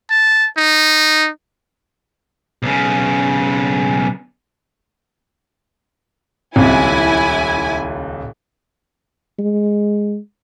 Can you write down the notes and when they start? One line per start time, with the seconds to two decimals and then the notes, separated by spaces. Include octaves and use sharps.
0.10 A5
0.57 D#4
2.63 B1 C#3
6.56 D#1 C#2 C4 E4 G#5
9.39 G#3